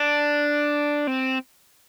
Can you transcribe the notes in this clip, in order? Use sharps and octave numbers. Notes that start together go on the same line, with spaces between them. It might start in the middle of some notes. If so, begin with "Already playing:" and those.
Already playing: D4
C4